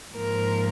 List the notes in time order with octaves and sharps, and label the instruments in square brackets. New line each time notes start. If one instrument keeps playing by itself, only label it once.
[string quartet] G#2 F3 A#3 A#4